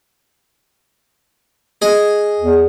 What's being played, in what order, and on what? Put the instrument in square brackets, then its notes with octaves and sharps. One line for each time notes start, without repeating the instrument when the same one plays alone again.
[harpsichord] G#4 D#5
[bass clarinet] E2